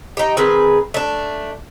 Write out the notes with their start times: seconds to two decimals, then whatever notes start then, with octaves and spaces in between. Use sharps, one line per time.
0.17 D#4 G4
0.37 D#3 C4 G#4 B4
0.94 A3 D4